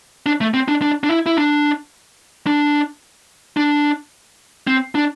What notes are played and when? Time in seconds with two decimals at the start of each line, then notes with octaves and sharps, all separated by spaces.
0.26 D4
0.41 A3
0.54 C4
0.68 D4
0.82 D4
1.04 D4
1.09 E4
1.26 E4
1.37 D4
2.47 D4
3.57 D4
4.67 C4
4.95 D4